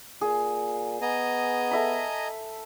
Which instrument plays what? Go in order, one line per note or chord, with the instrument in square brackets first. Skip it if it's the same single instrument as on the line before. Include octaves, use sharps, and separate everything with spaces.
[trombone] A#2 [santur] G#4
[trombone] B3 [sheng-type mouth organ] D#5 G#5 A#5
[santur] A4 E5 B5